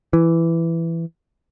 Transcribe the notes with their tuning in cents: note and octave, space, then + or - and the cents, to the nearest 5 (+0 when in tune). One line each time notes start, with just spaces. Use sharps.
E3 +10